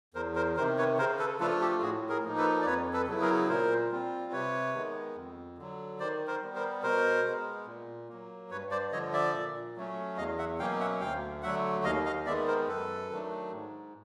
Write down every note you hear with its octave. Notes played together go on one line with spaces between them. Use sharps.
E2 A#4 C5
A#4 C5
C3 D#3 A#4 C5
B4 C#5
C#3 A#4 C5
A4 B4
F3 A3 D4 F4 A4 B4
G4 A4
A2 F#4 G#4
G#4 A#4
F3 A#3 D#4
A4 B4
D5
F2 B4 C#5
A4 B4
C#3 F#3 B3 E4 B4
G#4 A#4
A#2 A#4 C5
G3 C4 F4
C3 B4 C#5
D#3 G#3 B3
F2
D3 F#3
D#3 C5 D5
A#4 C5
G3 B3
A#4 C5
B2 A#4 C5
G#3 B3
A#2
F#3 A#3
G2 B4 C#5
C5 D5
D3 F3 C#5 D#5
D5 E5
A#2
F#3 A3 C#4
E2 D#5 F5
E5 F#5
B2 F#3 A#3 C#4 F5 G5
E5 F#5
D2 F5 G5
D3 F#3 A3 E5 F#5
D#2 D#5 F5
D#5 F5
D#3 G#3 B3 D5 E5
A#4 C5
F#2 A4 B4
D#3 F#3 A3 D4
G#2